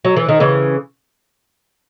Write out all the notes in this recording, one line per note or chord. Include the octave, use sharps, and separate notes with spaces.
F#3
E3
D#3
C#3 E3